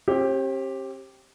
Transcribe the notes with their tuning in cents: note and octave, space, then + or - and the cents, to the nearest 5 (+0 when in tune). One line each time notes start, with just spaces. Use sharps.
C4 +45 G4 +0